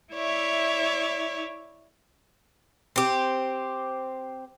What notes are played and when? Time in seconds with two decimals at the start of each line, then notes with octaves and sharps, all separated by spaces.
0.12 E4 C#5 D5 E5
2.96 C4 G4